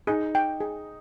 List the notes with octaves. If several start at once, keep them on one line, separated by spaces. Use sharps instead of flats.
D#4 G#4
G5
G#4